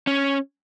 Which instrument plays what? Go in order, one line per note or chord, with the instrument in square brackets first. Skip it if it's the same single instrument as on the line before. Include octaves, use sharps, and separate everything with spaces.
[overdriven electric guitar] C#4